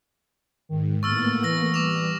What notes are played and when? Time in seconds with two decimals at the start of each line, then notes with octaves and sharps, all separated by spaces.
0.69 G#2 D#3
1.03 A2 A#3 B3 C#6 E6 F6 A6
1.43 E3 E6 A#6
1.74 G3 D6 F7